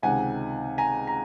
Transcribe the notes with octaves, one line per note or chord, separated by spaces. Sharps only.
C#2 C3 D#3 F#5 G#5
G#5 A#5
A#5